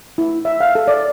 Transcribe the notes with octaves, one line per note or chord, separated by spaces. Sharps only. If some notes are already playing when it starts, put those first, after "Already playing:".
E4
E5
F5
A4
D5